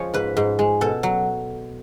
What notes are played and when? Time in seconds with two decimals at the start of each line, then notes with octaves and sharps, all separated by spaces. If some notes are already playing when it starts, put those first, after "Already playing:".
Already playing: F3 G#3 C#5
0.14 G#2 B4
0.37 G#2
0.59 G#3
0.81 B2 A4
1.03 F#3